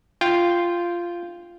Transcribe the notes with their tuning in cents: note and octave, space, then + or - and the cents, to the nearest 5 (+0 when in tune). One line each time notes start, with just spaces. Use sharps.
F4 -10 G5 +0